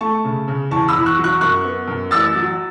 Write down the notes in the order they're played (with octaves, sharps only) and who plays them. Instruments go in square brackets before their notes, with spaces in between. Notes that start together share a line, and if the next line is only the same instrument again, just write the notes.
[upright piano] A3 A5 C#6
C#3
C#3
E2 A5 C#6
B5 E6
E2
C#6 F#6
F#3
C#6 F#6
F#2 C#6 F#6
B3
F#2
A1 E6 A6
F#3